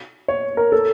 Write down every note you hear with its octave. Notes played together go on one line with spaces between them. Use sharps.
C#5
A#4
A4